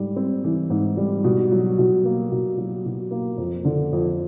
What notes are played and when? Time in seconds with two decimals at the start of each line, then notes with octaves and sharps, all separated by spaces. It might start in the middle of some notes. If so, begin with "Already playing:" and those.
Already playing: G#2 G3
0.16 C4
0.44 E3
0.70 G#2
0.97 G3
1.24 B2
1.51 F#3
1.78 B2
2.05 A#3
2.31 B2
2.57 F#3
2.85 B2
3.11 A#3
3.38 F2
3.65 D3
3.93 F2